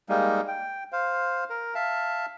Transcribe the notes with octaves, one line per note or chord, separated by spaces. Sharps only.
G3 G#3 A#3 D#4
G5
C5 F5
A#4
E5 F5 A5